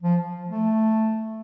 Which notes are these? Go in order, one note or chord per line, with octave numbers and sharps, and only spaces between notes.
F3
A3